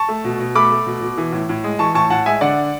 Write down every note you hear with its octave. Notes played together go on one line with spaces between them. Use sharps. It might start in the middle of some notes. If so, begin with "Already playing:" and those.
Already playing: A5 C#6
A3
B2
B2
A3 B5 D6
A3
B2
B2
E3
A2
A2
G#3
E3 A5 C#6
A2 A5 C#6
A2 F#5 A5
G#3 E5 G#5
D3 D5 F#5